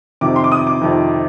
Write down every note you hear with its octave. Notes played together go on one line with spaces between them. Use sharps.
F2 C3 D#3 D6
C6
D6
D#6
D6
F2 C3 D#3